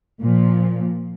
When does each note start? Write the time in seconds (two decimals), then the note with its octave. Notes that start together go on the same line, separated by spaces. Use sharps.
0.22 A#2 F3